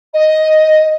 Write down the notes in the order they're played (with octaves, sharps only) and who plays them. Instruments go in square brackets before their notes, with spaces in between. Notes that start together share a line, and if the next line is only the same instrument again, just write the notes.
[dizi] D#5